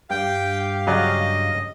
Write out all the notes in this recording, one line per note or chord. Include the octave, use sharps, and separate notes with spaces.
G2 G4 F5 G5
C#3 F#3 D5 D#5